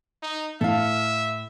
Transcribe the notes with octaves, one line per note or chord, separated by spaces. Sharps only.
D#4
A2 A4 E5 F5